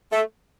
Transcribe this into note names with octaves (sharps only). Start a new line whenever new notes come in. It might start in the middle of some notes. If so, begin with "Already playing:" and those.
A3